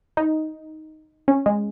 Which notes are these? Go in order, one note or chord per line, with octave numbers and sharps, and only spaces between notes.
D#4
C#4
G#3